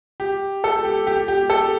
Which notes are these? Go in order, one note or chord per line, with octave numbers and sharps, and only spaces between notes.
G4
A4
G4
G4
G4
A4